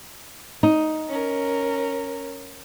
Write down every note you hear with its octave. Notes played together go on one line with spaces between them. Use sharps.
D#4
C#4 A#4